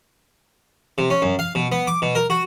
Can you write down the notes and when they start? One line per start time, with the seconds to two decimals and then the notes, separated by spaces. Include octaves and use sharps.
0.98 C3
1.10 C#4
1.22 F#2
1.39 F5
1.55 B2
1.72 B3
1.87 D6
2.02 B2
2.15 A#4
2.30 F#4